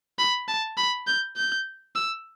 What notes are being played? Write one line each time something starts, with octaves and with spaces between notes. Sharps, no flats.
B5
A5
B5
G6
G6
E6